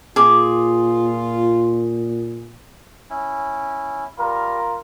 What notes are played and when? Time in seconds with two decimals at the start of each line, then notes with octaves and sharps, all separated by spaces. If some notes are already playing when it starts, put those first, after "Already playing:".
0.16 A#2 F4 G#4 D6
3.10 C#4 E4
4.18 G3 F4 A#4